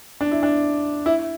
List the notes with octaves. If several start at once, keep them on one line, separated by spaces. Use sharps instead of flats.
D4
E4
D4
E4